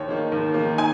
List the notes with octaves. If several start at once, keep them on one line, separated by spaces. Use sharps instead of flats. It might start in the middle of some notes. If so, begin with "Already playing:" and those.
Already playing: D#2 C#5
D#3 A#3
D#2
A#3
D#3
G#5